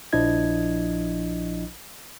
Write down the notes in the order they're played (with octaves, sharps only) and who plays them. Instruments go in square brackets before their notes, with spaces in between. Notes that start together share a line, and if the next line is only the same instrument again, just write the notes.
[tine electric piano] A#1 F3 D4 E4 D#5 G#6